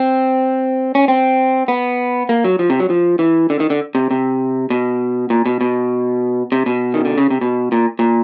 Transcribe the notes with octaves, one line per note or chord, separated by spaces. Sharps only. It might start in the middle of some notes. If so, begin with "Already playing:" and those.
Already playing: C4
C#4
C4
B3
A#3
F#3
F3
C3
F#3
F3
E3
D3
D#3
D3
C3
C3
B2
A#2
B2
B2
C3
B2
D#3
D3
C#3
C3
B2
A#2
A#2